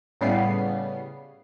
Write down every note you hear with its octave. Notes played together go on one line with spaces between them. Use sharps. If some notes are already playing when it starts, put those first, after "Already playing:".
A2 C#3 G3 B3 C7